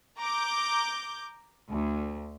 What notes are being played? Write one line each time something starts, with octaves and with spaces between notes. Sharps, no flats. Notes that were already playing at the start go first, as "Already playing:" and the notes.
A#5 D6 G6
D2